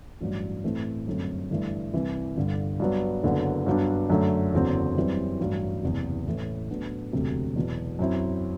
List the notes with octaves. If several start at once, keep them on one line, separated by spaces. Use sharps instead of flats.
A1 G2 F#3
A2 E3 A3 C4
G1 F#2 D3 A3 C4
G1 G2 E3 A3
C2 C3 E3
G1 G2 D3
G2 F#3 B3
F#1 F#2 D3 F#3 B3
G2 F#3 B3 D4
F#2 D3 A3
F#1 E2 D3 F#3 C4
F#2 E3 G3 C4
A1 G2 F#3
F#1 E2 C3
A1 A2 E3
A2 F#3 B3 D4
E1 D2 C3 F#3
E2 B2 F#3
F#2 F#3 C4 E4